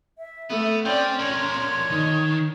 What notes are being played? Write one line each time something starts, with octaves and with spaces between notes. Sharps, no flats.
E5
A3 B3
C4 C#4 D5 G5 C6
D4 A#4 C#5
D#3